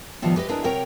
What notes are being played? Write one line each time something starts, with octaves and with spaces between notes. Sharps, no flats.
A2 D#3 F3 G3 B3
G4 B4 D#5
D4 E4 G#4 A#4 B4 D#5
C3 F#3 A#4 C#5 G5